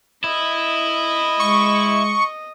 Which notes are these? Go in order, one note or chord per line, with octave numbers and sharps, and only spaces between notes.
E4 D#5
G#3 C#6